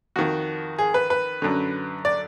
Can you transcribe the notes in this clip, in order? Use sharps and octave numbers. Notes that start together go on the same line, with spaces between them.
F2 D#3 F#4
G#4
B4
B4
F#2 D3
D5